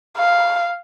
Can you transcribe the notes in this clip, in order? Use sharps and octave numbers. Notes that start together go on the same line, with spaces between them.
F5